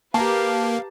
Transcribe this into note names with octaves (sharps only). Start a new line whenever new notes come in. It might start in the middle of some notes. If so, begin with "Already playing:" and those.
A#3 G4 B4 F5 A5 A#5